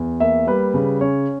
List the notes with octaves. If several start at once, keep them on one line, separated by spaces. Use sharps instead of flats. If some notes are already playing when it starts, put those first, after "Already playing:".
Already playing: E2
A#3 E5
G3 B4
C#3
C#4 C#5